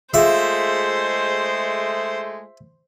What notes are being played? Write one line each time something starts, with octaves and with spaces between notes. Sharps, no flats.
G#3 A3 F4 G#4 C5 E5 F5